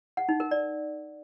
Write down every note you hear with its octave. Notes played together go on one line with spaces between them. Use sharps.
F#5
D#4
A#4
D5